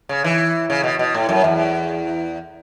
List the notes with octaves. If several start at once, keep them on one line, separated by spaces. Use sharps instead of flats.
C#3
E3
C#3
B2
B2
A2
F#2
E2